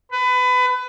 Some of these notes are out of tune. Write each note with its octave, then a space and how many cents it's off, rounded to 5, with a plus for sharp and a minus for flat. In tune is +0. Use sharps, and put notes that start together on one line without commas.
B4 +25